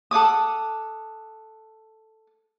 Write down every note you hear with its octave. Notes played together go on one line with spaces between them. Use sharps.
A4 F#5 D6 D#6